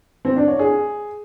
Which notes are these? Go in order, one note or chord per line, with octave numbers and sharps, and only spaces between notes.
C4
D4
C#5
G#4